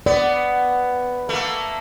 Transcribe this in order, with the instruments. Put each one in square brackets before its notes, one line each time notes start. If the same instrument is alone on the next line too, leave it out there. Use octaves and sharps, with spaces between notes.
[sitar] B3 [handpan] D5
[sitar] A3 A#3